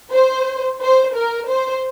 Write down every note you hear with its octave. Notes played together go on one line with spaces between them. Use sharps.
C5
C5
A#4
C5